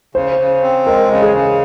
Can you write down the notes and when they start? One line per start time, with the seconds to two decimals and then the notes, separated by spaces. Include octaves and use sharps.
0.15 C#3 C5
0.39 C#3
0.62 C4
0.86 G#3 A#4
1.11 C#3
1.23 G#4
1.34 C#3